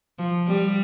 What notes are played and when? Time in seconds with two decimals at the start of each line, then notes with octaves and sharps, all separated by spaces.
0.19 F3
0.47 G3